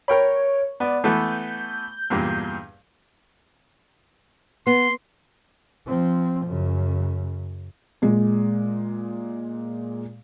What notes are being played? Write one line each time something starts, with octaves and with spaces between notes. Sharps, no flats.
A#4 C#5 G5 B5
B3 D5
E3 A3 B3 G6
E2 G2 A#2
B3 C6
F3 C4
F#2 C#3
A#2 G#3